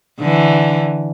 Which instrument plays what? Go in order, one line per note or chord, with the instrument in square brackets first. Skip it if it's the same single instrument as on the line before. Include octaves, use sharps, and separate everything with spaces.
[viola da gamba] D3 E3